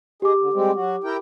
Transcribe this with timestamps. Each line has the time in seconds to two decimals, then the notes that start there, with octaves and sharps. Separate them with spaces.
0.22 D#4 G4 G#4 D6
0.39 D3
0.53 G3 G#3 C4
0.75 F#3 F#4
1.04 E4 A#4 G5